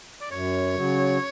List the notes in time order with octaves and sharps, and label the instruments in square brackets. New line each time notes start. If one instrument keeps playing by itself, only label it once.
[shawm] D5
[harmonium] F#2 [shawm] C#5
[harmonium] C#3 F#3